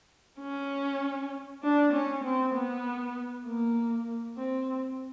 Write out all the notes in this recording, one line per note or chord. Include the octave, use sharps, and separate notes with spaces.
C#4
D4
C#4
C4
B3
A#3
C4